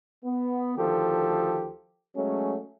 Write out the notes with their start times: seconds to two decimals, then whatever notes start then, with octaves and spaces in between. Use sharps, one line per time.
0.24 B3
0.77 D2 D#3 F3 G4 A4
2.15 F#3 G#3 A3 C#4